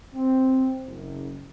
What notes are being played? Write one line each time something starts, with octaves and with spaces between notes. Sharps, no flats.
C4
F#1